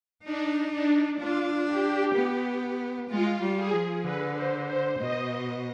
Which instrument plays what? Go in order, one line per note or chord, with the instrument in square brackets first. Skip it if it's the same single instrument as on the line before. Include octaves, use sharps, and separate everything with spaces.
[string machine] D4 [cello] D#4
[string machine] D4
[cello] D4 [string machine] F4
[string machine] G4
[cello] B3
[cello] G#3 [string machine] F4
[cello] G3
[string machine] G#4
[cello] F3
[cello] D3 [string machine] B4
[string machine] C5
C5
[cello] B2 [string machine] D#5